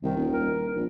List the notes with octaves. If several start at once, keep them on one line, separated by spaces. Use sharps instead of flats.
C2 D#3
D#1
A#4
A#1